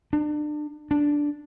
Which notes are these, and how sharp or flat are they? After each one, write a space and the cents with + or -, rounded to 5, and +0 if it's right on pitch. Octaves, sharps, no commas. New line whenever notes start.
D4 +30
D4 -5